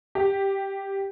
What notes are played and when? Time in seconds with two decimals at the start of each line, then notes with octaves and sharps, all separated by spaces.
0.15 G4